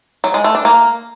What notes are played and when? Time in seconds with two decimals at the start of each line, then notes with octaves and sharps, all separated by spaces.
0.24 F#3
0.34 G#3
0.44 A3
0.55 D4
0.65 A#3